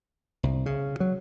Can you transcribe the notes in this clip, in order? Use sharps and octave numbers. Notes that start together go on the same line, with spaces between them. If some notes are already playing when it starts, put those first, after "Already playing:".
C2
C#3
F#3